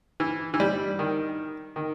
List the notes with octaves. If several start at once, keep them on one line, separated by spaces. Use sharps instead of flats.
E3
E3
G3
D#3
D#3